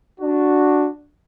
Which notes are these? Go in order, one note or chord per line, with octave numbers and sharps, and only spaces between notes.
D4 F#4